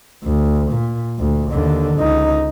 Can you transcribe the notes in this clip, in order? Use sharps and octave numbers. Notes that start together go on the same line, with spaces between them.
D2
A#2
D2
D#2 D3
C#2 D#4